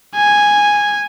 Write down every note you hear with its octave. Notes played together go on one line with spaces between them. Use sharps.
G#5